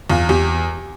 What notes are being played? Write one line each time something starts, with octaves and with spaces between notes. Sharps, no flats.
E2 F4
E2 G4